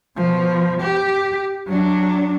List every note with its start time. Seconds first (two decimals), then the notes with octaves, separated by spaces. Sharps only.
0.16 B2 F3
0.81 G4
1.68 F#3 D4